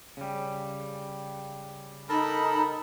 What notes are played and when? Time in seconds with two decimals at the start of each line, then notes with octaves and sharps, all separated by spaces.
0.17 C#3 G3
2.09 D#4 A4 A#4 A5 B5